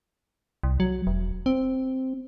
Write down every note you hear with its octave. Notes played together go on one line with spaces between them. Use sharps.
C2
F#3
E1
C4